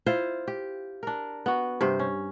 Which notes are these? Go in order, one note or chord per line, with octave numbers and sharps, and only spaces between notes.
E4 F4 C5
G4
D4 A#4
B3 F#4
G2 C3 C5
C#4